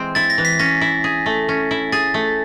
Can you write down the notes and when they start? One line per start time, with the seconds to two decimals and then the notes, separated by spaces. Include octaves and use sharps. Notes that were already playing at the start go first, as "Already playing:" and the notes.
Already playing: E3 G#3 C4
0.15 E4 A6
0.30 A#6
0.38 E3
0.45 B6
0.59 C#4 A#6
0.81 E4
1.04 G#4
1.26 A3
1.49 C#4
1.71 E4
1.92 G#4 A6
2.14 A3